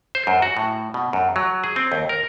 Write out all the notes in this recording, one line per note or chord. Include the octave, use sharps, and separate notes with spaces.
C5
F#2
F#4
A2
B2
F#2
F#3
G#4
C4
D#2
A#4